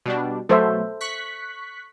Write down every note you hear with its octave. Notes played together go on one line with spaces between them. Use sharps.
B2 G3 D4
B2 F#3 A3 A4 C5 E5
C#6 F#6 B6